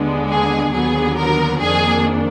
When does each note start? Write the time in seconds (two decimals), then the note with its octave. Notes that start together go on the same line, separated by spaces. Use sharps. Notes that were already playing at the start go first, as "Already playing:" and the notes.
Already playing: D#2 D3 G#3 B3 D4
0.30 G#4
0.73 D#2 D3 F#3 B3 G#4
1.18 A#4
1.61 F2 D#3 A#3 D4 G#4